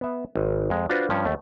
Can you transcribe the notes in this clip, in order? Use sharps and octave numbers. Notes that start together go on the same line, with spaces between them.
B3 E5
G#1
F2 G#3
D4 F4 F#4 B4 C5
G2 F3 C#4
D#2 A3